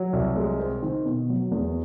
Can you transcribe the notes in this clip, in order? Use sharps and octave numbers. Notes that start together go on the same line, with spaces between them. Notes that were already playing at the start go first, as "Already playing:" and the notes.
Already playing: F#3
C2
G#3
C4
D#3
B2
F#3
E2